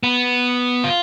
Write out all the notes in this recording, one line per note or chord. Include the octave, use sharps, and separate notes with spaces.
B3
F4